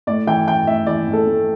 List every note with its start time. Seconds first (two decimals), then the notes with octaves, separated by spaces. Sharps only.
0.07 A2 D5
0.27 E3 G5
0.48 E3 G5
0.67 A2 E5
0.87 E3 D5
1.07 A2
1.13 A4
1.27 A3